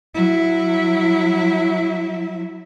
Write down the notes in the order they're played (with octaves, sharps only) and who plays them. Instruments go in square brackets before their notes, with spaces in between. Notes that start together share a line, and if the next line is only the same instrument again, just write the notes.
[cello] F#3 E4